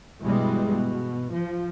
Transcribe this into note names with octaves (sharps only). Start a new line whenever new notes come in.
G2 B2 E3 G3 G#3
B2
F3